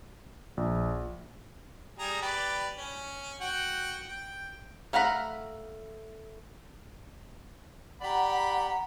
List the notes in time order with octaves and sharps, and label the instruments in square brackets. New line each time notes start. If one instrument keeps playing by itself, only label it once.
[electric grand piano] A#1
[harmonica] G3 G#4 A#5
G4 B4 D5
C#4
F#4 F#5 G5
G5
[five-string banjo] A3 F5 F#5 A#5 B5
[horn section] G4 D5 B5 [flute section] F#5 A#5